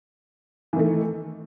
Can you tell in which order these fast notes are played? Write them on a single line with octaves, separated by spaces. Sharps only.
E3 D#3 A3